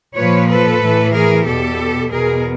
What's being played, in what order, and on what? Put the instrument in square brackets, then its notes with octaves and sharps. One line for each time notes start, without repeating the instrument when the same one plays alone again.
[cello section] A#2 F3 B4 C#5
A4 B4
A2 E3
G#4 A#4
E2 B2 G4 A4
E2 B2 G#4 A#4